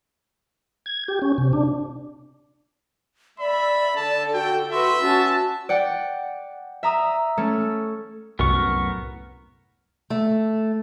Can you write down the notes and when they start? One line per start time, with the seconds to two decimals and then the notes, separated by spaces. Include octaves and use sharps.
0.86 G#6
1.08 G4
1.22 C#4
1.38 C3
1.53 D4
3.40 D5 E5 B5
3.96 D3 A4 A5
4.34 F#4 G5
4.72 F#4 B4 E5 C6
5.02 C#4 F#4 A5
5.69 D5 F#5 G5
6.83 E5 A#5 D#6
7.37 A3 C#4 A4
8.39 C2 F#2 A2 B3 A#4 C#6
10.10 A3